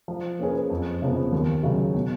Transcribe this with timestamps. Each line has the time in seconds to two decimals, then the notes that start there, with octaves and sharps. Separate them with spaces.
0.08 F3
0.39 A#3 C#4 G#4 B4
0.70 F2
1.02 C#3 F3 B3
1.32 D#2
1.63 C#3 F#3
1.95 B2